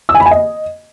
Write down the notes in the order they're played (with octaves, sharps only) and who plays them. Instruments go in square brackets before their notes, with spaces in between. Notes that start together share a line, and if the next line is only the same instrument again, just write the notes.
[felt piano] E6
G#5
B5
G#5
D#5